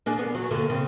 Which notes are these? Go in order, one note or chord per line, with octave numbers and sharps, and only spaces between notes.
A#3 D4 G#4
B3
F#3
G2 D3 A#3
C#3 C4